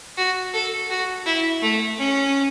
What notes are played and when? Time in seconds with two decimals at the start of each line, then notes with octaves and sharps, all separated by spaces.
0.17 F#4
0.53 A4
0.90 F#4
1.25 E4
1.62 A3
1.98 C#4